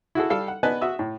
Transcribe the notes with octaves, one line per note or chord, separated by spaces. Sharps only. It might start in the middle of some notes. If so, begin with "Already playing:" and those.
E4 F#4 G#4 A4
G3 A4 F5 G5
F#5
B3 B4 D5 D#5 G#5 A5
F#4 E5 D#6 E6
A2